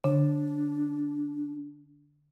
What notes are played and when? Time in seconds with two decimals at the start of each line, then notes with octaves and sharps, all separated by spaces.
0.04 D3 D4